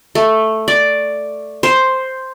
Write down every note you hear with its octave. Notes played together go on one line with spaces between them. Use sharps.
A3
D5
C5